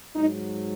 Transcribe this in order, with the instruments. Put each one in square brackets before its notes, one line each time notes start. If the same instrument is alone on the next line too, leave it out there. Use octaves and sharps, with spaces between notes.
[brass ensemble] G#2 F#3 D#4